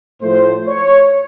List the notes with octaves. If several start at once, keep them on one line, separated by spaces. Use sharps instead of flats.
A2 F3 A3 C5
C#5